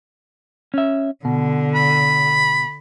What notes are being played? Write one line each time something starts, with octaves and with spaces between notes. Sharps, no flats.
C#4 E5
B2 D3
B5